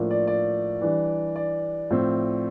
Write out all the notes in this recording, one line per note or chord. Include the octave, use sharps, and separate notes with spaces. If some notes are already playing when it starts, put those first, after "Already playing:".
Already playing: A2 F3 A#3 D4
D5
D5
E3 G3 D4
D5
A2 F3 C4